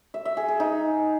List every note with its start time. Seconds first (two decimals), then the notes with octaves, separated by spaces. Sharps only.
0.14 E5
0.25 E5
0.37 G#4
0.48 G#4
0.60 D#4